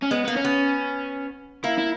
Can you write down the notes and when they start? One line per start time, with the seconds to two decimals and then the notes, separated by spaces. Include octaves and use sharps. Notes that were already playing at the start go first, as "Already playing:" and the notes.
0.02 C#4
0.11 G#3 B3
0.25 A#3 B3
0.36 C#4
0.45 B3
1.64 A#3 E4
1.78 E4